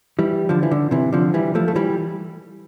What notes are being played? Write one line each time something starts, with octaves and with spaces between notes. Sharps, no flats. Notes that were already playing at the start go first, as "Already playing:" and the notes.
E3 G3
D3 F3
E3
D3
C3 E3
D3 F3
E3 G3
F3 A3
A3
E3 G3